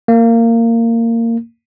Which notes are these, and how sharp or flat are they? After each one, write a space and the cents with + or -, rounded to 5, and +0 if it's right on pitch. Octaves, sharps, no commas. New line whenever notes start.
A#3 -20